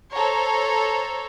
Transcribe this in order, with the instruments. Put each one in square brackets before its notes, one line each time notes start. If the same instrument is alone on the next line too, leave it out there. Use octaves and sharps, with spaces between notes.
[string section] A4 C5 C#5 A#5